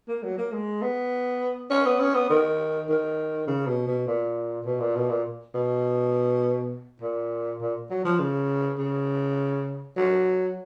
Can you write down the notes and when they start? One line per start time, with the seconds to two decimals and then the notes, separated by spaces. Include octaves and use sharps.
0.08 A#3
0.23 F#3
0.38 A#3
0.52 G#3
0.82 B3
1.70 C#4
1.86 B3
2.00 C#4
2.14 B3
2.29 D#3
2.89 D#3
3.47 C#3
3.67 B2
3.87 B2
4.07 A#2
4.65 B2
4.80 A#2
4.95 B2
5.09 A#2
5.54 B2
7.01 A#2
7.60 A#2
7.90 F#3
8.04 F3
8.19 C#3
8.78 C#3
9.97 F#3